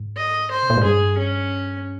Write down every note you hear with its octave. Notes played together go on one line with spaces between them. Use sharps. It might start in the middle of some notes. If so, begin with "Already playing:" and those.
Already playing: G#2
D#5
C5
C3
A#2
G#2
G2 G#4
C#4